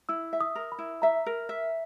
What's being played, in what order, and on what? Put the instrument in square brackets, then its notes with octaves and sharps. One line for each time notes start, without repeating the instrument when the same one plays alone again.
[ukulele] E4 [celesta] E6
[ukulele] E5
[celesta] D#6
[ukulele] A#4
[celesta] B5
[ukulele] E4
[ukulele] E5 [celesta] A#5
[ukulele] A#4
E5